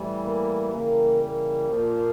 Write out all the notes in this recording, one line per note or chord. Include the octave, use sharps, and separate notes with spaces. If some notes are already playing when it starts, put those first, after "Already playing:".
Already playing: A2 E3 G3
A#3
C#3 E3 G3 A#3
A#3
A#2 F3